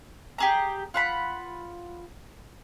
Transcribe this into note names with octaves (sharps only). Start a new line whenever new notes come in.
G4 G#4 A#5
F4 F#5 B5